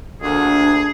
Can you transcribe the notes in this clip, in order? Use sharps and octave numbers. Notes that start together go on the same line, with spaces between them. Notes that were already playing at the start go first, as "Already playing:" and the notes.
D2 A#2 D4 G#4